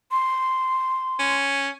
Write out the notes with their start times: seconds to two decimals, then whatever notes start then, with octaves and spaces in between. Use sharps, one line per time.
0.11 C6
1.19 C#4